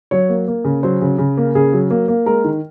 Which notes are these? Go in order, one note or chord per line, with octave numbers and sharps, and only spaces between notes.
F#3 C#5
A#3
A#3
C#3
F#3 C5
C#3
C#3
A#3
C#3 G#4
F#3
A#3
A#3
G#3 A#4
D#3